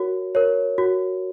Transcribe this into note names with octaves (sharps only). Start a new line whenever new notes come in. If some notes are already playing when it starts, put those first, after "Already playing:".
Already playing: F#4 A#4 C#5
A#4 C#5
F#4